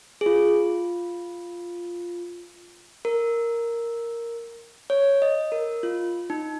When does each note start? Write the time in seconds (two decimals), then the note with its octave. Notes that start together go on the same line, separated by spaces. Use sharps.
0.21 G#4
0.26 F4
3.05 A#4
4.90 C#5
5.22 D#5
5.52 A#4
5.83 F4
6.30 D#4